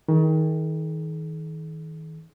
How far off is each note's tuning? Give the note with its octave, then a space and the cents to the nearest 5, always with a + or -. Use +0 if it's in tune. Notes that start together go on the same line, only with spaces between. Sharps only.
D#3 +30 G#4 +45